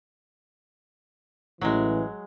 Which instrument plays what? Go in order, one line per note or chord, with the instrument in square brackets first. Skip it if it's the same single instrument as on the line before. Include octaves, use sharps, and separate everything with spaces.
[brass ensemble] A1 E3 [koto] F#3 G#3